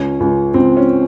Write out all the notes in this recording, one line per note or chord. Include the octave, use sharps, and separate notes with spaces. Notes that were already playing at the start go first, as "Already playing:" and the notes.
Already playing: C#2 C#4
C#2
C#2 C4
C#4